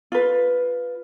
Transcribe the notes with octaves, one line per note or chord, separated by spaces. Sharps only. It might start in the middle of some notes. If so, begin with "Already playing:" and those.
F4 B4